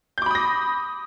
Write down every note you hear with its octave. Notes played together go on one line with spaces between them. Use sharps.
B5 D6 D#6 G6 A#6